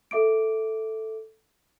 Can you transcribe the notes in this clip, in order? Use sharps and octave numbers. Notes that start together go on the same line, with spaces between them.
A4 E5 D6 D7